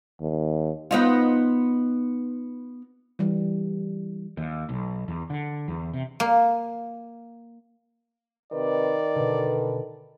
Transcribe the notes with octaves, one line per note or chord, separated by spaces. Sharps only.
D#2
B3 D#4 F4
E3 G3
D#2
B1
E2
D3
E2
C3
A#3
C3 D#3 B4 D5
B2 D3 A4 B4